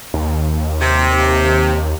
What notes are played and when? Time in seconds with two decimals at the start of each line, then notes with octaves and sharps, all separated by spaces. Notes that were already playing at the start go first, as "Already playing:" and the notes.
0.14 D#2
0.81 C3